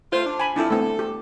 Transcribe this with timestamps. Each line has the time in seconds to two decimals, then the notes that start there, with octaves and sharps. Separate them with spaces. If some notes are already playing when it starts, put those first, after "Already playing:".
0.13 A3 F4 C5
0.26 D4
0.40 G#5 B5
0.56 F2 F3 D4 E4 A4
0.71 A3 B3 C4 A4
0.99 G4